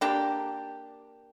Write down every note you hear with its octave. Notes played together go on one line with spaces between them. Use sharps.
A#3 D4 G4